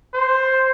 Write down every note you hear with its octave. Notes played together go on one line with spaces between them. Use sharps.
C5